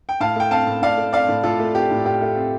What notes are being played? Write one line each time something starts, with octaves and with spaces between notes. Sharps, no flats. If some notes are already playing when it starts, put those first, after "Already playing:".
G5
A2 F5 A5
A3 G5
C4 F5 A5
A2
A2 D5 F5
A3
C4 D5 F5
A2
A2 F4 A4
A3
C4 G4
A2
A2 G4
A3
C4